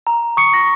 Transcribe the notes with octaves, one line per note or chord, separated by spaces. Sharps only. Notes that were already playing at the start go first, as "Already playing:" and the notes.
A#5
C#6 D#6 C#7
A#6